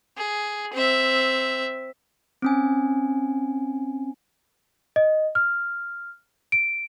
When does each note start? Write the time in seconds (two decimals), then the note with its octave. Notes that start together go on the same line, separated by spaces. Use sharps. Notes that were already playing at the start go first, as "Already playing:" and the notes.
0.17 G#4
0.73 C4 E5
2.42 C4 C#4 G#5
4.96 D#5
5.35 F6
6.52 D7